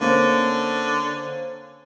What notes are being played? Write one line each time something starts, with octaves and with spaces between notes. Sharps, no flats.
D3 A#3 C4 C#4